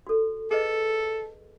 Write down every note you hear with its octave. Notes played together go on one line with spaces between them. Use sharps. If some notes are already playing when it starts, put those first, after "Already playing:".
F#4 A4
G#4 A4 B4 D#5